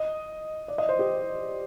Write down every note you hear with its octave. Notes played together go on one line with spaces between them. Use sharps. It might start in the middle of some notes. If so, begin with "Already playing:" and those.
Already playing: D#5
D5
D#5
C5
G4